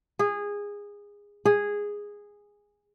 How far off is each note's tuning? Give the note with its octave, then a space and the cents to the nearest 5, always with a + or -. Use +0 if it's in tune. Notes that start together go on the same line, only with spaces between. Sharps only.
G#4 -20
G#4 -10